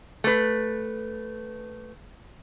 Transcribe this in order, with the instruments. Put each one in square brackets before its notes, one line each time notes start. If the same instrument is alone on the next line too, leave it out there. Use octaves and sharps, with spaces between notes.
[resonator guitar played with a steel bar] A3 B4